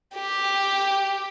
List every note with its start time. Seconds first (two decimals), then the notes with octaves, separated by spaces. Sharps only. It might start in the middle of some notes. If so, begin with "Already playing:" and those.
0.14 G4